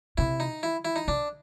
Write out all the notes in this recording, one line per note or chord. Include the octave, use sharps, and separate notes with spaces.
C3 E4
D#4
E4
E4
D#4
C3 D4